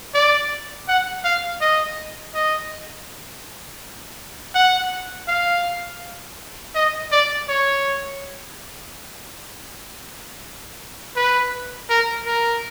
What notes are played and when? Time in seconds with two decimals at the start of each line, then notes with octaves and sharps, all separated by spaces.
0.14 D5
0.88 F#5
1.24 F5
1.61 D#5
2.35 D#5
4.55 F#5
5.28 F5
6.75 D#5
7.12 D5
7.49 C#5
11.16 B4
11.90 A#4
12.27 A#4